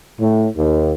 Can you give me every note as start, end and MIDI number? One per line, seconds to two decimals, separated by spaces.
0.20 0.48 45
0.56 0.93 39